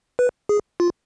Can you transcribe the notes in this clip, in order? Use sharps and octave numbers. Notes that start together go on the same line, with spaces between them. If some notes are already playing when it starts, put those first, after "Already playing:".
B4
G#4
F4